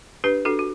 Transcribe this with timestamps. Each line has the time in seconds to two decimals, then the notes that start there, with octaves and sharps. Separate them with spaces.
0.24 D4 G4 B4
0.45 D4 F#4 A4
0.59 F#4